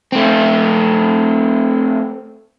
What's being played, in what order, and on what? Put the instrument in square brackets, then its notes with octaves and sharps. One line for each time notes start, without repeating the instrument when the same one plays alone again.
[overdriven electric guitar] A3 C4